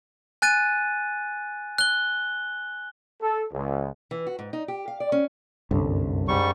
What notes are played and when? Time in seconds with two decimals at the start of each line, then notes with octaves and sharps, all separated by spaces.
0.42 G#5 F#6 A6 D#7
1.78 F#6 G7
3.23 A4
3.53 C#2
4.11 E3
4.27 F#4
4.39 G#2
4.53 D#4
4.68 G4
4.88 F5
5.00 D5
5.12 C#4
5.71 G1 C2 F#2 D3 A4
6.28 G#2 G3 C#6